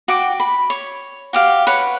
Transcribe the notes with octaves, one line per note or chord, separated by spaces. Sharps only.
F#4 G5 D6
B5
C#5
F#4 G4 F5
B4 C#5 F#5